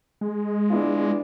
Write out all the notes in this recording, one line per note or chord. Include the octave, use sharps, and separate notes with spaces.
G#3
B3 D4 E4 F4